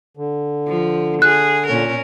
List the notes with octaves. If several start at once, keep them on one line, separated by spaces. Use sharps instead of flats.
D3
F3
G#4 F#6
A#2 C#4 A#4